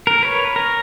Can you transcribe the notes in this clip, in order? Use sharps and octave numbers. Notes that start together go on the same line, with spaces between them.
A#4
B4 C#5
A#4